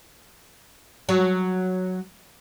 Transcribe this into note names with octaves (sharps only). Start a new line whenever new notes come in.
F#3